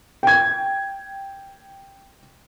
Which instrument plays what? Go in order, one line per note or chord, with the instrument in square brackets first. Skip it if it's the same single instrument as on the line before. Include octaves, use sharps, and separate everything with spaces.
[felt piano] G5 G#6